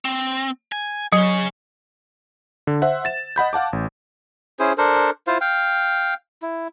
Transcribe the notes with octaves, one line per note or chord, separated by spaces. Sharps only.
C4
G#5
F#3 G#4 C#5
D3
C5 E5 F#5
A6 E7
D#5 F#5 B5 G6
F5 F#5 A5 D6
A1
C#4 E4 G#4 C5
D4 A4 A#4 C5
E4 F4 C5 F5
F5 G5
E4